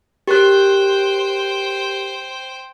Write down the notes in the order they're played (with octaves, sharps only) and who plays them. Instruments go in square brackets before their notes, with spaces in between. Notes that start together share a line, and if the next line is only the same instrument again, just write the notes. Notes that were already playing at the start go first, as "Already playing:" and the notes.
[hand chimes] G4 A#4 F#6 [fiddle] C5 G5